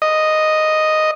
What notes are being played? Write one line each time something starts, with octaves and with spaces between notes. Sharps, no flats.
D#5